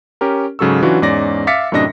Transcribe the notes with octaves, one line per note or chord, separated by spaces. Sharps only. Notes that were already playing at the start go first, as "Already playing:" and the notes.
C#4 G4 A#4
G#2 C#3 F#3 A4 C#6 E6
E3 F#3 C#4 D4 F4 F#4
E2 G#2 C#4 D5 A#6
E5 F5 D6 A6 B6 C#7
F#2 A2 C3 D4 D#5 A#6